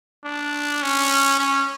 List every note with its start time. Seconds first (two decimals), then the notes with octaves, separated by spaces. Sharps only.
0.24 D4
0.82 C#4
1.39 C#4